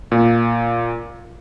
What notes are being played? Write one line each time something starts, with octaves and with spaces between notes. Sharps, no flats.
A#2